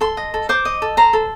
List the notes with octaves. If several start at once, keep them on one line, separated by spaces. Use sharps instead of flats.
A4 C6
D#5
A4
C5 D6
D#5
A4
C5 A#5
A4